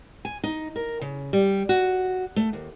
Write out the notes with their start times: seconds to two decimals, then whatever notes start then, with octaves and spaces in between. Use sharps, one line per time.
0.25 G#5
0.44 D#4
0.76 A#4
1.01 C#3
1.33 G3
1.69 F#4
2.36 A3
2.53 D#2